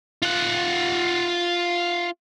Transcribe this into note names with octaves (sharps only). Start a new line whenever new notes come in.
F4 F#5